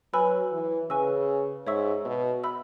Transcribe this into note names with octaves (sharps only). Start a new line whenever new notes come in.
F#3 B4 G#5 B5 E6
E3
C#3 B4 G#5 C#6 E6
G#2 C#5 E5 C#6 E6
B2
E5 B5 E6